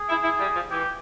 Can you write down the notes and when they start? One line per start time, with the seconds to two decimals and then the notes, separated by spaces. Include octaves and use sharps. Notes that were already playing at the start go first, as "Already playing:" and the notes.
Already playing: G#4
0.09 E4
0.23 E4
0.39 G3
0.55 F3
0.70 E3 G4